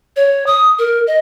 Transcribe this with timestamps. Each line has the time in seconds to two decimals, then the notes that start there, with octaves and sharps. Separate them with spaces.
0.16 C#5
0.47 D#6
0.79 A#4
1.07 D#5